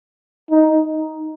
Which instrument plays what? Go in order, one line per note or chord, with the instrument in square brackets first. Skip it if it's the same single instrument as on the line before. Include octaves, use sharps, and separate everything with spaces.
[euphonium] D#4